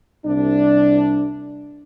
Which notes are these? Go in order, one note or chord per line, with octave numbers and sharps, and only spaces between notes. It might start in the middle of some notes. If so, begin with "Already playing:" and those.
C2 D4